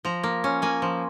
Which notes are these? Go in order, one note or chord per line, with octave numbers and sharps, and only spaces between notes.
F3 A#5
A#3
C#4
A#3 G#5
F3